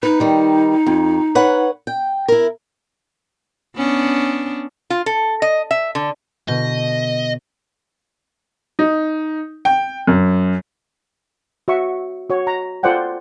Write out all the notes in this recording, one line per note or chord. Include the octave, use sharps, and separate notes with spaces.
D#4 B4
D#3 G3
F2
B4 C#5 F#5
G5
E4 A#4
B3 C#4 D4
F4
A4
D#5
E5
D3
B2 D3 D#5 G6
D#4
G5
F#2
F#4 E5 C#6
F#4 C#5
A#5
F4 A4 C5 D5 F#5 G5